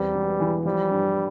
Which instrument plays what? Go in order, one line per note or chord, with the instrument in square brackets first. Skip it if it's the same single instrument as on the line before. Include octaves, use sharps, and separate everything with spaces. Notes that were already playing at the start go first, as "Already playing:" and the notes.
Already playing: [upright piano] E2 C4 [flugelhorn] G3
[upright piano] E1
E3
[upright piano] F3 [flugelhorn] G3
[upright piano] G2